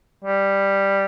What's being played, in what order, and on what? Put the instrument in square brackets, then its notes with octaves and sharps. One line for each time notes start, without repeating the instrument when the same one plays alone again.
[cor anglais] G3